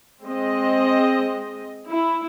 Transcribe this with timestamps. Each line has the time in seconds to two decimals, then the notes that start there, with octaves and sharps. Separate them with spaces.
0.25 G#3 C4 D#5
1.88 E4